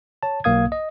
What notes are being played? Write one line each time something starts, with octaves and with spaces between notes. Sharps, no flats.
C#5 A5
B1 A#3 F5 D#6 G#6
D#5